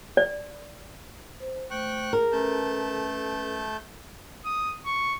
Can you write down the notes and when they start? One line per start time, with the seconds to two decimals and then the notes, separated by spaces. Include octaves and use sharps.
0.17 D5
1.40 C5
1.71 A3 C5 G5 C#6 F#6
2.13 G#4 A#4
2.33 A3 C#4 A4 B4 A5 G6
4.45 D#6
4.86 C#6